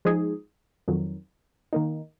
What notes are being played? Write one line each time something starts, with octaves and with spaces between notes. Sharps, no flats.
F3 G#3 D#4 G#4
F2 D#3 F#3
D#3 A#3 D#4